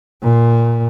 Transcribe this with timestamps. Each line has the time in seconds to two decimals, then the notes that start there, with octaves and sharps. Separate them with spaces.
0.23 A#2